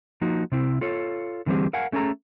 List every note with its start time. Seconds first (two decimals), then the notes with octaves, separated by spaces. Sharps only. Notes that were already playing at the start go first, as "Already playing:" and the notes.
0.21 F3 A#3 D#4 F#4
0.52 C3 C4 E4
0.81 F4 A4 C#5
1.46 D3 E3 G3 C4 G4 G#4
1.73 A#4 F5 F#5 G#5
1.92 A3 C#4 G#4 A4 A#5